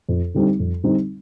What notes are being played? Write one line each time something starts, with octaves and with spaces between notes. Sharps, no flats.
F2
D3 G3 C4 D#4
F2
D3 G3 C4 D#4